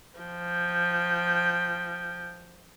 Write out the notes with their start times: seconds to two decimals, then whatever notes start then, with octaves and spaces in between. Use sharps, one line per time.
0.20 F3 G5